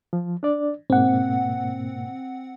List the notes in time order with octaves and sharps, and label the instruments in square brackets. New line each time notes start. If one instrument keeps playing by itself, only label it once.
[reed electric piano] F3
D4 D5
[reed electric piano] G#2 B2 A#3 [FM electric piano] C4 F#5